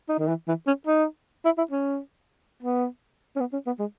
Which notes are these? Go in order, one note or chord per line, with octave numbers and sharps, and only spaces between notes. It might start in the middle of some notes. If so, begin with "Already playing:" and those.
D#4
D#3
E3
E3
C#4
D#4
E4
E4
C#4
B3
C#4
B3
C#4
B3
G#3